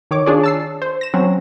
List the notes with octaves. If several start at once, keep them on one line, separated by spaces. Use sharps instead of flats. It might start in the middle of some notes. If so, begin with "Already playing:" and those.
D#3 C#5 D6
D4 F4 G#4 C#5 D5
A5 E6 C7
C5
A#6 E7
F#3 C4 C#4